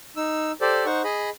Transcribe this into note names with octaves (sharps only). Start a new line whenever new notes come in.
D#4 E6
G4 A4 C5 D5
D#4 C5 F#5 C#6
G#4 D#5 B5